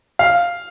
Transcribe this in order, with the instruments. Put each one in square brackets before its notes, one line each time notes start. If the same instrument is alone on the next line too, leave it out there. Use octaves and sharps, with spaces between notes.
[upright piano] F5